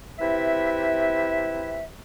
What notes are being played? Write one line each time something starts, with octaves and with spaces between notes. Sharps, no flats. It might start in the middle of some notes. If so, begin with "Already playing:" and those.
C3 E4 B4 E5